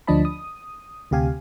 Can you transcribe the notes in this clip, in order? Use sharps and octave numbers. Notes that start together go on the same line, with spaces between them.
D2 F3 D4 D#5 A5 B5
D#6
D2 C3 G4 F5 G#5